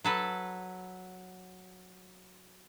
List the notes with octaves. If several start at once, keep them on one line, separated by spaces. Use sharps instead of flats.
F#3 A4 B4